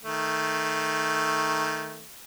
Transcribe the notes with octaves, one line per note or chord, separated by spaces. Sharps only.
D#3 A3